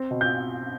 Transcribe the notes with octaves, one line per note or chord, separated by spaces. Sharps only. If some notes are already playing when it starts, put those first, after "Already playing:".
Already playing: C4
B2
G6